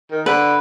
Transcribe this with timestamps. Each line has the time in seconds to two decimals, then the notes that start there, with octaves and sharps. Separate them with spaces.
0.11 D#3
0.26 D3 B4